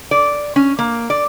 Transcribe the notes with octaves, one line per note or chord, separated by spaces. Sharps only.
D5
C#4
A#3
D5